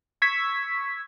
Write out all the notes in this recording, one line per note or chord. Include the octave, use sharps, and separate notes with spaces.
C#6 E6 G#6 B6